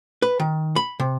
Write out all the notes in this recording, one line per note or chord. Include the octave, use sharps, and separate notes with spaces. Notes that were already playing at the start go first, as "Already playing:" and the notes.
B4
D#3
B5
C3